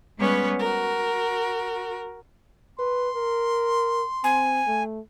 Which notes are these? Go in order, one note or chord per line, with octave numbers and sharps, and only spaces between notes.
G3 G#3 B3 C#4 B4 C#5
F#4 A#4
B4 C6
A#4
C4 G#5
A3